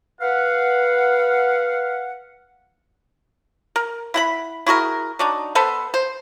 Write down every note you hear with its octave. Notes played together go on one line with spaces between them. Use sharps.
B4 F5 F#5
A#4
E4 F#5 B5
E4 F#4 G#4 A#4
F#3 D4 D#4
B3 A4 B4 C5
C5